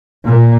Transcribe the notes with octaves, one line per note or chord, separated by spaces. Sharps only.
A#2